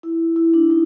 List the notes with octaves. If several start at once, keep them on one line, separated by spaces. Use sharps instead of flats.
E4
E4
D4
D#4